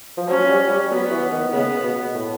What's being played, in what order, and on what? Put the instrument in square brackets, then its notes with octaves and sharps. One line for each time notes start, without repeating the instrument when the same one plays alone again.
[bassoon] F3
[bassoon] F#3 [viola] C#4
[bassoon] G3
G3
[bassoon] F#3 [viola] B3
[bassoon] E3
D#3
[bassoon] C#3 [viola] B3
[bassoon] B2
A2